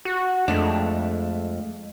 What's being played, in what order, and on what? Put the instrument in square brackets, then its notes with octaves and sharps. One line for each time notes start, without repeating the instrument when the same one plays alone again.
[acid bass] F#4
[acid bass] F2 [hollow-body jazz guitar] G#3 A3 D4